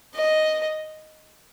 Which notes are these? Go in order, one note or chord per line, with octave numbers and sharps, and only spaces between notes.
D#5